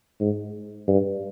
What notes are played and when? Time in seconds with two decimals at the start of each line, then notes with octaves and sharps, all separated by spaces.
0.20 G#2
0.87 G2